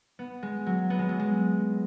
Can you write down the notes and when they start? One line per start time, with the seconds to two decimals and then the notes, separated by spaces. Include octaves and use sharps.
0.19 B3
0.43 G#3
0.66 F#3
0.90 B3
0.99 G#3
1.09 F#3
1.19 G#3